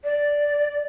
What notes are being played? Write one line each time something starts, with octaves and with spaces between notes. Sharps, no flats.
D5